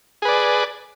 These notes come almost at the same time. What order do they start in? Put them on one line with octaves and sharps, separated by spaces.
G#4 B4 D5